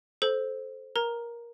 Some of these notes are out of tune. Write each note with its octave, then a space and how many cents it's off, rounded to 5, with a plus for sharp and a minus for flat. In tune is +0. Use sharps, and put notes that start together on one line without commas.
A4 -15 C5 +0
A#4 +15 A#5 +0